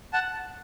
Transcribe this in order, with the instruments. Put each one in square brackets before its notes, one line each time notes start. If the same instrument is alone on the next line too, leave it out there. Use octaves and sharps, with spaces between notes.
[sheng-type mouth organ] F#5 A5